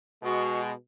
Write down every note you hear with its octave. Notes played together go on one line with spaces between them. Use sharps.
B2 G#3 F#4 C#6